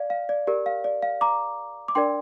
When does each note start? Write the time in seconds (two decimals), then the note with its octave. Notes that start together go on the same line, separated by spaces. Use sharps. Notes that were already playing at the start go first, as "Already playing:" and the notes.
Already playing: D5 F5
0.10 F5
0.29 D5
0.47 G4 A#4 D5
0.66 F5
0.84 D5
1.03 F5
1.21 A#5 D6
1.88 D6
1.95 D4 A#4 D5 G5 C6